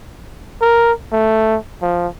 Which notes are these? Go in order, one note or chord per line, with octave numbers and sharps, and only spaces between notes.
A#4
A3
F3